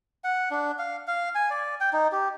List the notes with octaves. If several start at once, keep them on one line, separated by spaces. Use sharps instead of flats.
F#5
D4
F5
F5
G#5
D5
G5
D#4
G4